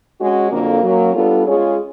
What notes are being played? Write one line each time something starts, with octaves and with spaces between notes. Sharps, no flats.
G#3 C#4 F#4
F2 D3 F#3 A#3
F#3 A#3 C#4
G3 B3 D4 F4 A4
G#3 C#4 F4 G#4 C#5